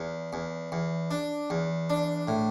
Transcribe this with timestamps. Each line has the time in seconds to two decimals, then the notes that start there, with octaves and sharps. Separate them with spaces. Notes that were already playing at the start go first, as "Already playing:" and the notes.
Already playing: E2
0.33 E2
0.72 E2
1.11 D4
1.50 E2
1.90 D4
2.28 A2